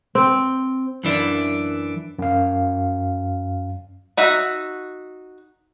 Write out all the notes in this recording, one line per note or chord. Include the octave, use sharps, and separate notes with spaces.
C4
F#2 E3 D4
F#2 F5
D#4 F#4 E5